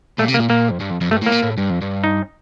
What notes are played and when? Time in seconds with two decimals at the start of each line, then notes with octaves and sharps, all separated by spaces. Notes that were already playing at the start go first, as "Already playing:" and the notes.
0.19 A#2 A3
0.29 C3
0.34 A#3
0.39 A#2
0.50 A#2 A#3
0.71 F2
0.81 G2
0.91 F2
1.01 F2
1.11 G2 A3
1.21 A2
1.26 A#3
1.32 A#2
1.42 A2
1.58 G2
1.70 F2
1.82 G2
2.04 D#4